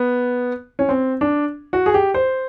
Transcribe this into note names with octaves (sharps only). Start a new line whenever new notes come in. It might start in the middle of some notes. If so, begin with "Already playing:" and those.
Already playing: B3
C#4
C4
D4
F#4
G#4
G4
C5